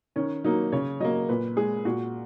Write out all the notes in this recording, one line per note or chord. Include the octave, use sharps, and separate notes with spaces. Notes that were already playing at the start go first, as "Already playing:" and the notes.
D#3 C#4
F#3 A#3 D#4
C#3 C#5
F#3 A#3 D#5
A#2 B4
G#3 G#4
A#2 F#4